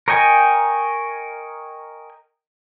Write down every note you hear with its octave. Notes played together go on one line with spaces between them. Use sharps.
A#4 C#5 D#5 G5 G#5